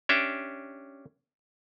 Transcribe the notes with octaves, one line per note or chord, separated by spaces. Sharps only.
C#4 D4 G4 E5